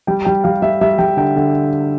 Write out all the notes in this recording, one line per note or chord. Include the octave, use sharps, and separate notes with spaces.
G3 G5
G3 G5
G3 F5
G3 E5
G3 E5
G3 G5
D3 G5
D3